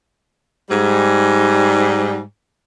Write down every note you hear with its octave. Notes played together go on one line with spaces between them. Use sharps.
G#2 G3